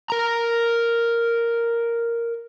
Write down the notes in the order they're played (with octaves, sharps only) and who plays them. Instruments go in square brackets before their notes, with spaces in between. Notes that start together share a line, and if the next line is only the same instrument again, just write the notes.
[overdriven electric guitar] A#4 A#5